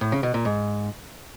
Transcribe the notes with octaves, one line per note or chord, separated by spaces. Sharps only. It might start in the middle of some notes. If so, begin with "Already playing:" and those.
A2
C#3
B2
A#2
G#2